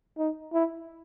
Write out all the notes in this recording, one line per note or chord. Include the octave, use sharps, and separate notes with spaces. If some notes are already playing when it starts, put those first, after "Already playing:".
D#4
E4